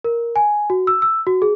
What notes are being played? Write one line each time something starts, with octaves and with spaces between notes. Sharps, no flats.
A#4
G#5
F#4
E6
E6
F#4
G#4